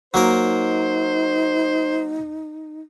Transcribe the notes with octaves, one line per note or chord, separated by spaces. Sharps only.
F#3 A#3 D#4 A#4 C5